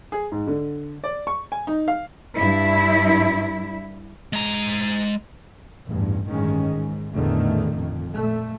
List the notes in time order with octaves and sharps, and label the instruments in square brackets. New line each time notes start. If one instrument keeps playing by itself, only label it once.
[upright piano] G#4
G#2
D3
D5
C#6
G#5
D#4
F5
[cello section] G2 E4
[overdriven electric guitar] G#3 A#5
[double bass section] A1 E2 G2
A1 G2 D#3 G#3 C#4
G#2
A1 E2 A#2 D3 D#3 A3
F2
A#2 A3